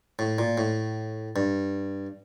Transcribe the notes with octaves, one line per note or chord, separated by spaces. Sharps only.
A2
A#2
A2
G2